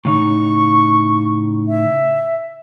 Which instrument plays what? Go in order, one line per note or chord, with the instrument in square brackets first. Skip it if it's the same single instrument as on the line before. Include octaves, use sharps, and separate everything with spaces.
[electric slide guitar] A2 C#3 D#4 [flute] C#6
[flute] E5